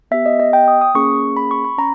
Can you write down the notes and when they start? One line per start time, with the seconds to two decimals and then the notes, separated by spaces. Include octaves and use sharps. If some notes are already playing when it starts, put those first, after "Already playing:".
0.11 B3 G4 E5
0.26 D#5
0.40 D#5
0.53 G5
0.68 D#6
0.81 D#6
0.95 A#3 C#4 G#4 C#6
1.37 B5
1.51 C#6
1.64 B5
1.78 C#4 A#5